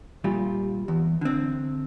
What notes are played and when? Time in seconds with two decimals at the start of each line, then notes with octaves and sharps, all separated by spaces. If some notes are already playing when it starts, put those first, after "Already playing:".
0.24 A#2 G3 F4
0.88 E2
1.21 D3 C4